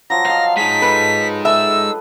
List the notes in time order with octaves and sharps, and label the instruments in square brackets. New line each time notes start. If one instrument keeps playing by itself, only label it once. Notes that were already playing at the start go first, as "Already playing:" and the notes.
[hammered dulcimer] F3 F#3 [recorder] A#6
[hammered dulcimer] D#5 A5 [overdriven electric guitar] F5
[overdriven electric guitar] G#3 D#4 [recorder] B6
[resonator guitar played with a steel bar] A4 B4
[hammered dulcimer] A4 B4 [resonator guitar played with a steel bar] E5 [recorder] E6